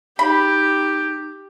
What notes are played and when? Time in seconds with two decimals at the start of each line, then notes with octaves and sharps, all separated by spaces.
0.19 D#4 G4 B5